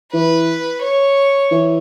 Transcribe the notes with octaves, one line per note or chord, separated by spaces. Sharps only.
E3 B4
C#5
E3